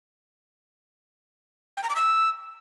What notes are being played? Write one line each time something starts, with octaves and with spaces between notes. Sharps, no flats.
G5
A#5
D6
E6